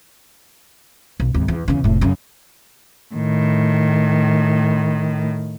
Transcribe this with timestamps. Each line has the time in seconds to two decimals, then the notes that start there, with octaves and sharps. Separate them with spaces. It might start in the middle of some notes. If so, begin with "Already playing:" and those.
1.20 B1
1.34 G#1 D#2
1.48 E2
1.68 E2 C#3
1.84 F1 A2
2.01 F#2 C#3
3.15 A2 D#3